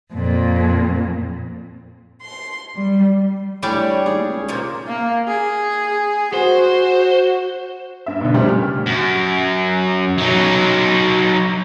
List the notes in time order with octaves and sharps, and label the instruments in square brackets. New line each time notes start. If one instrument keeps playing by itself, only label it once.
[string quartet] F2 A#2
C6
G3
[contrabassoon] A2 [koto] G3 D5 G#5 [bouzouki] D4 C#5
[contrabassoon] D#2 [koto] G#4
[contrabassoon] C#2
[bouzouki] A#2 F3 A#3
[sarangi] A#3
G#4
[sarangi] F#4 [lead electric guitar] C5
[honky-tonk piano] G2 E5
B2 D3
A#2 C#3 F3 G3 A3
F6
[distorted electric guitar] F#2
F#3 D#4